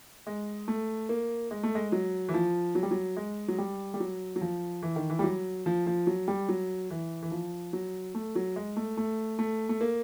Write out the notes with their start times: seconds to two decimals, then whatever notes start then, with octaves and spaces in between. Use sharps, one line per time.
0.27 G#3
0.68 A3
1.09 A#3
1.51 G#3
1.63 A3
1.75 G#3
1.92 F#3
2.29 E3
2.34 F3
2.75 F#3
2.83 G3
2.91 F#3
3.17 G#3
3.48 F#3
3.58 G3
3.94 G3
4.00 F#3
4.36 F#3
4.41 F3
4.82 E3
4.96 D#3
5.10 E3
5.19 G3
5.24 F#3
5.66 F3
5.87 F3
6.07 F#3
6.28 G3
6.49 F#3
6.90 E3
7.22 E3
7.31 F3
7.73 F#3
8.15 A3
8.36 F#3
8.56 G#3
8.76 A3
8.97 A3
9.39 A3
9.69 A3
9.81 A#3